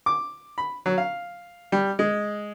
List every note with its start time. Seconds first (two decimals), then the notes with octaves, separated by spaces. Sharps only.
0.06 D6
0.58 B5
0.86 F#3
0.98 F5
1.72 G3
1.99 G#3